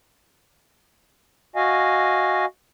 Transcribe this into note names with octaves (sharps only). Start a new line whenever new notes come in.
F#4 D#5 F5 G#5